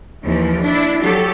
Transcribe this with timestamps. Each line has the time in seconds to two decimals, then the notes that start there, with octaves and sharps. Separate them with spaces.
0.24 D#2 E3 F3
0.61 D4 E4
1.02 F#3 G4 A4